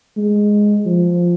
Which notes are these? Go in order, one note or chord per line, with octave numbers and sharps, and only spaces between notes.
G#3
F3